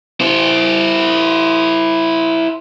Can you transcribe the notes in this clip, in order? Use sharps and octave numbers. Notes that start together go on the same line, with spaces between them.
E4 C5